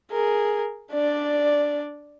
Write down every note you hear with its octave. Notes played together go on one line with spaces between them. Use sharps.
G#4 A#4
D4 D5